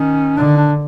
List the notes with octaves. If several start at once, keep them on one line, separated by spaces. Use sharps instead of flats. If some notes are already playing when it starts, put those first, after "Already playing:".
Already playing: D#3 C#4
D3 D4
D4